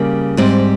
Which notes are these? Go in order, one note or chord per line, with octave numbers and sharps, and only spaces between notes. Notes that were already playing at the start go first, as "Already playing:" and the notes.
Already playing: C#3 G3 A#3
G#2 G3 C4